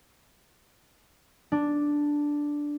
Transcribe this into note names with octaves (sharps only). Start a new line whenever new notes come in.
D4